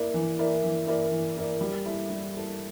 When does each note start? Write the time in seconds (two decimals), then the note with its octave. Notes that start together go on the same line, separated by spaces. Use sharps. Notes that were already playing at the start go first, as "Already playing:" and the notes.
Already playing: A#3 E4 A#4 D5
0.14 E3
0.39 A#3 E4 A#4 D5
0.63 E3
0.87 A#3 E4 A#4 D5
1.11 E3
1.36 A#3 E4 A#4 D5
1.61 G3
1.85 A#3 E4 A4
2.09 G3
2.34 A#3 E4 A4